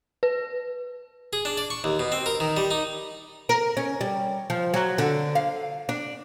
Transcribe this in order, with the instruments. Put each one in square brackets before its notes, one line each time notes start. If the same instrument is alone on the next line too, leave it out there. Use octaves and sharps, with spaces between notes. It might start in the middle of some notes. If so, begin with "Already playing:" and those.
[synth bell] B4
[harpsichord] G#4
D4
D5
C#6
D#2
B2
C4
A#4
D#3
G3
D#4
[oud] A#4
C#4
G3
F3
F#3
D3
F5
D4